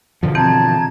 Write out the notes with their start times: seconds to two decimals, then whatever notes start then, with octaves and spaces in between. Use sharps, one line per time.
0.23 B2 D3 F3
0.35 E3 C4 A5 A#5 G#6